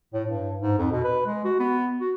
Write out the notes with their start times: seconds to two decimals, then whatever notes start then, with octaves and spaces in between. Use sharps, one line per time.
0.13 A2
0.28 G2
0.62 G#2
0.78 F2
0.91 B2
1.04 B4
1.26 G#3
1.44 F#4
1.59 B3
2.01 F#4